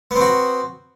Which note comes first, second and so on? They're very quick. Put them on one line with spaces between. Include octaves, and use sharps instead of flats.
B3 C4 F#4